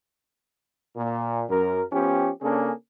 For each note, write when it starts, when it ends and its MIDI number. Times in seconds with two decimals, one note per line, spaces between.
0.97 1.43 46
1.50 1.82 42
1.50 1.82 70
1.92 2.29 53
1.92 2.29 59
1.92 2.29 61
1.92 2.29 67
2.42 2.71 49
2.42 2.71 58
2.42 2.71 61
2.42 2.71 62
2.42 2.71 68
2.42 2.71 69